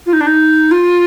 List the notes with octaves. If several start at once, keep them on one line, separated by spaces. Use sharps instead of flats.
F4
D#4
D4
D#4
F4